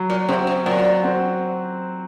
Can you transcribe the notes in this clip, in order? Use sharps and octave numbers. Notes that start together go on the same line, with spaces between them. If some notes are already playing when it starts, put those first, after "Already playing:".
Already playing: F#3
A#2
C3 C4 F#4
C3
A#2 F#3
C4 F#4